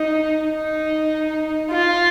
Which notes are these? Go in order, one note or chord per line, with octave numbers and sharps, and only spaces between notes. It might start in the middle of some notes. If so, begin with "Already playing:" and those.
Already playing: D#4
D#4
F4